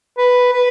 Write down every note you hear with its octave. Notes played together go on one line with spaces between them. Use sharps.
B4
B4